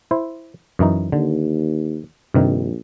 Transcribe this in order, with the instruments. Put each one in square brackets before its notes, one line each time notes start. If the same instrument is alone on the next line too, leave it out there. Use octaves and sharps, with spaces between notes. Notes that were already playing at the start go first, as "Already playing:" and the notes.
[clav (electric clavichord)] E4 C5
F#2 E3 D#4
[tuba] D#2 [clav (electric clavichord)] D3
[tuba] A#1 [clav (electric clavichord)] G2 C3 D#3